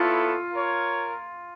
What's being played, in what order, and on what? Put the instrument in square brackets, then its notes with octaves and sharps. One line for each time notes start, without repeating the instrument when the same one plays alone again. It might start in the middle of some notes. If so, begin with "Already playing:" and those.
Already playing: [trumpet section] B3 E4 A4 C#5 [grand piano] F4
[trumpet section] F4 A#4 C#5